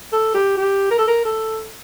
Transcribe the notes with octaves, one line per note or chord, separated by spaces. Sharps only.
A4
G4
G4
A#4
A4
A#4
A4